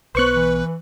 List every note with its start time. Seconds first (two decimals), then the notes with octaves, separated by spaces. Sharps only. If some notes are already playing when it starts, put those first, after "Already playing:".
0.15 B1 B3 B4 C5 C#6 F#6
0.34 E3